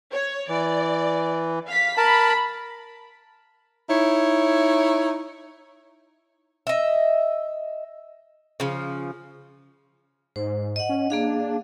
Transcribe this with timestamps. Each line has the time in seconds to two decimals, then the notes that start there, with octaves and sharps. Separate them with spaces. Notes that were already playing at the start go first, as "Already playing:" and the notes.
0.12 C#5
0.49 E3 D5
1.67 F5 B6
1.97 A#4 A5 B5
3.89 D#4 E4 C#5
6.67 D#5 E5
8.60 C#3 F3
10.36 G#2 C5
10.76 D#5 F#5
10.89 C#4
11.10 A#3 D4 G#4 F5